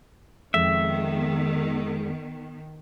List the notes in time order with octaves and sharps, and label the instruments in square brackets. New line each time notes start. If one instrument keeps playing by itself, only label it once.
[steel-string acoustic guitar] F2 [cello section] D#3 B3 [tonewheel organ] G#3 [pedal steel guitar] E5